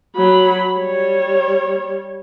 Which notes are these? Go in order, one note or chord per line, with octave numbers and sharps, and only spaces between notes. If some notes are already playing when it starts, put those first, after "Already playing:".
F#3 B5
G3 C#5